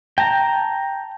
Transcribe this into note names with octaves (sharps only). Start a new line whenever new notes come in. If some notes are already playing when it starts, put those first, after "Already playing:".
G5 A5 A#5